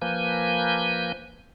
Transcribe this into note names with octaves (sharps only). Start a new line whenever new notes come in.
F3 A#3 B4 G#5 G6